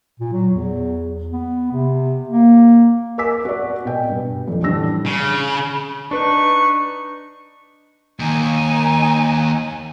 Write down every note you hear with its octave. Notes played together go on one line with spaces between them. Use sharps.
A#2
F#3
E2
B3
C3
A#3
A#4 D#5 G#5 D6 E6 B6
F#4 D5
B2 G5 G#5
G2
F2 D3
A1 G3 C#4 D4 E6 A#6
C#3
D4 D#4 B4 C#6
D#2 D#4 G#5